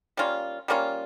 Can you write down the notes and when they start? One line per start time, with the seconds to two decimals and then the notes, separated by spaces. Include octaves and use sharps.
0.17 G3 A#3 C#4 F4
0.68 G3 A#3 C#4 F4